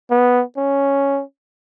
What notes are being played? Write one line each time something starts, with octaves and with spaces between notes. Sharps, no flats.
B3
C#4